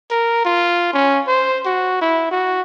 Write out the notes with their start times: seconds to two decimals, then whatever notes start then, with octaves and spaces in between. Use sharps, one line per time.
0.11 A#4
0.45 F4
0.94 C#4
1.27 C5
1.66 F#4
2.02 E4
2.32 F#4